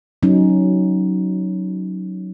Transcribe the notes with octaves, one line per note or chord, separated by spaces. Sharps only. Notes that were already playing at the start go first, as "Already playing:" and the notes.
F#3 C#4 D#4